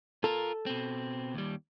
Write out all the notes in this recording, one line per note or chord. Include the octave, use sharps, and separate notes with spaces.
F4 A4 A#4
B2 C4
D#2 G3